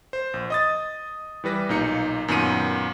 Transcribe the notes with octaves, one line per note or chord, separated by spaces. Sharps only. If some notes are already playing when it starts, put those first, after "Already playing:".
C5
A#1
D#5 D#6 A6
E3 G3 B4 A#6
B1 A#2 A#3 D#4 D#5 C#7
F#2 A#2 D#3 B3 C#7 D#7